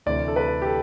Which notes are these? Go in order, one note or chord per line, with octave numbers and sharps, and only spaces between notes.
D2 C3 E3 D5
A4
B4
G4
A4